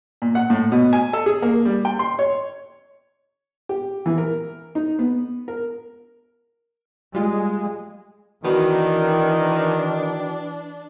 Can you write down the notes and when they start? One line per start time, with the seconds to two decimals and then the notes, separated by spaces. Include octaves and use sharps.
0.22 A#2
0.35 F#5
0.50 A2
0.72 B2
0.93 G#5
1.13 A4
1.26 G#4
1.42 A#3
1.65 G3
1.85 G5
1.99 C6
2.19 C#5
3.69 G4
4.06 E3
4.18 A#4
4.75 D#4
4.99 B3
5.48 A#4
7.14 G3 G#3 F4
8.45 B2 D#3 E3 D4